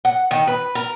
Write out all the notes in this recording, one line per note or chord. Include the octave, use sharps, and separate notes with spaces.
F#5
D#3
B4
A#4